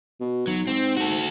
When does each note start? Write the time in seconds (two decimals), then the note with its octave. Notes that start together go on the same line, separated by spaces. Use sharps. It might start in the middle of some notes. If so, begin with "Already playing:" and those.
0.21 B2
0.47 B1 F#3
0.67 G#2 C4
0.96 F#4 A4